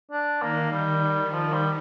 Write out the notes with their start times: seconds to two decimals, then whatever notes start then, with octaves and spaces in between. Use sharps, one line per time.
0.11 D4
0.41 D#3 A#3
0.71 D#3 G3
1.33 F3
1.53 G3